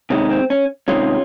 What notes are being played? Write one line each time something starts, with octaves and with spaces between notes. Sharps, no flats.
C3 D#3 G#3 C#4
C4
C#4
C3 D#3 G#3 C#4 F4